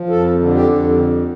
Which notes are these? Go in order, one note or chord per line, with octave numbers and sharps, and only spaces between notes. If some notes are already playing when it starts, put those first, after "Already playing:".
Already playing: F3
F2 A4
D3
G4
F2